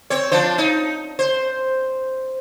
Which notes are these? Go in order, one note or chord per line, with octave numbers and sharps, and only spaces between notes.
C4 C#5
F3 D4 C5
D#4
C5